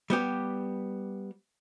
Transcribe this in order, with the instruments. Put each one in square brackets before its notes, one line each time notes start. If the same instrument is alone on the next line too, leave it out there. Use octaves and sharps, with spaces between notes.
[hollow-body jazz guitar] G3 B3 G4